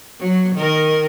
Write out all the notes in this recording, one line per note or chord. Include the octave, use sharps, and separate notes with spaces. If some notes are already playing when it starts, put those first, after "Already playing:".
F#3
D#3 A#4